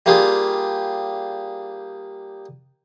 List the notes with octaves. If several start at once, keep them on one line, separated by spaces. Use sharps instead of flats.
G3 A#3 D4 F4 G4 G#4